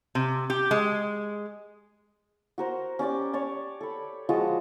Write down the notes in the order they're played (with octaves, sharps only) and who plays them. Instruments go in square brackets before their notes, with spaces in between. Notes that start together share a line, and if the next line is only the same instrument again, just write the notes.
[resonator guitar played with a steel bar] C3
G4
G#3
[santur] F#4 A#4 C5
C#4 G4 D5 D6
C#5 D5 A5
A4 B5
F3 G#3 F4 F#4